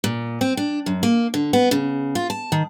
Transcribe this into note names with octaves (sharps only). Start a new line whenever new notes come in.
A#2
C4
D4
F#2
A#3
D3
B3
C#3
F4
A5
D#3